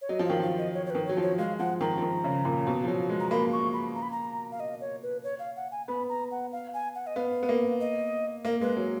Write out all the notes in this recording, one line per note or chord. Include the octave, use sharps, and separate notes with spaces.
C#5
F#3 D#5
F3
D#3 F5
F3 F5
D#5
C#5
C#5
D#3 B4
F#3 C#5
F3
C#5
G#3 F5
F3 F#5
D#3 A#5
F3
D#3
C#3
A#2
B2
F3
F#3
G#3
A#5
A#3 B5
C#6
B5
A#5
B5
A#5
F5
D#5
C#5
B4
C#5
F5
F#5
G#5
B3 B5
A#5
F#5
F5
G#5
F#5
D#5
B3 F5
B3
A#3
D#5
A#3 A#4
G#3 B4
F#3